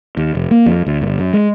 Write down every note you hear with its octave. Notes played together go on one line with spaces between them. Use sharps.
D#2
F1
A#3
F2
D2
G1
F#2
G#3